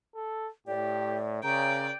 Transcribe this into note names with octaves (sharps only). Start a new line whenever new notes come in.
A4
A2 G4 D5
C#3 A#4 D5 G5 A#5